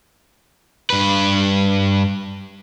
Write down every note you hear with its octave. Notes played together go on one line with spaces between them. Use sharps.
G2 B4